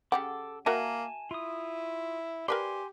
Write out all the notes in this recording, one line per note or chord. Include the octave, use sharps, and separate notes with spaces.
C#3 G4 A4 F#5 D6
A#3 F#4 A#4 E5 G#5 A5
E4 F4 D#6
G4 A#4 B4 D5 G#5 C6